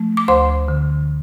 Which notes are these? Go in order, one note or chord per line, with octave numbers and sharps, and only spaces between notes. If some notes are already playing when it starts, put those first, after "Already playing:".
Already playing: F3 A3
D6
D2 C5 C6
D3